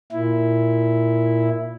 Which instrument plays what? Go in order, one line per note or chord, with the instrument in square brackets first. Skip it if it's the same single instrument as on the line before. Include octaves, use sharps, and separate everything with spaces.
[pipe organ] A#2 E4